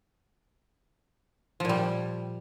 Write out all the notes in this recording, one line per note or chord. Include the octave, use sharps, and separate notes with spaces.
A#2 F3 G3